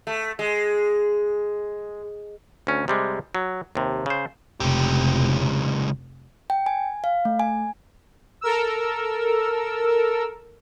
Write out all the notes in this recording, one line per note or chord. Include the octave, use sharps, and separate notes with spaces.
A3
G#3
D2 C#4
C3 G3 G#3
F#3
D#2 C3
C#3 C5
F1 C#2 G4
G5
G#5
F5
A3
G#5
A4 A#4 E6